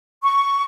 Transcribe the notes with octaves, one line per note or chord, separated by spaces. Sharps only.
C#6